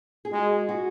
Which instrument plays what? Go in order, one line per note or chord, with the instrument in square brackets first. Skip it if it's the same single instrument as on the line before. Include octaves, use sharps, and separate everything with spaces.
[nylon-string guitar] G#4
[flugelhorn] G#3 [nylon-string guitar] F#4
[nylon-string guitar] F#4